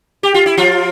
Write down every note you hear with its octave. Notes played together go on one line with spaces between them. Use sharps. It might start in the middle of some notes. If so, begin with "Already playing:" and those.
G4
F4
E4
F3 F4